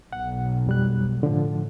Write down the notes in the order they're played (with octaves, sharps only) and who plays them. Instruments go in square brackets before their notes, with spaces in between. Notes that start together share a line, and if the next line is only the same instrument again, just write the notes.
[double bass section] B1 [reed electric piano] F#5
[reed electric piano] F2 G3 F#6
[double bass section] A2 [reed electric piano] D3 F3